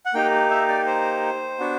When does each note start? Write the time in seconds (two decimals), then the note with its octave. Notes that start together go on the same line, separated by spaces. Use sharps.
0.06 F#5
0.14 A#3 D#4 G4 G5
0.50 E5
0.69 D5
0.87 C5
1.59 B3 D4 F#4